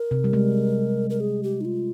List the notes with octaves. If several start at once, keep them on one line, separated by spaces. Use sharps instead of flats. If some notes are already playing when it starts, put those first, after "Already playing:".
Already playing: A#4
C3
G3
G#3
A#4
G#4
G4
D#4
F4